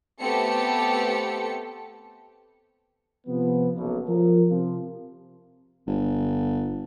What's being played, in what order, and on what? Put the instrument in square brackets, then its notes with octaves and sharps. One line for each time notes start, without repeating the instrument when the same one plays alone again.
[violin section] A3 B3 C4 G4 A4 C#7
[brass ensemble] C3 F3 B3
F#1 B1
F3 A#4
C3 F3
[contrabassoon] G1